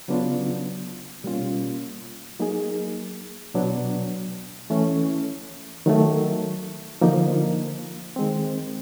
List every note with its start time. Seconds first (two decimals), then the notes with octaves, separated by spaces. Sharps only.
0.08 C#3 F#3 B3 D4 F4
1.24 B2 G3 A#3 C#4 F4
2.39 F#3 A#3 D#4 G#4
3.54 B2 F#3 B3 D4
4.70 E3 A3 C#4
5.86 D#3 F#3 A3
7.01 D3 F3 A#3 D#4
8.16 D#3 G#3 C4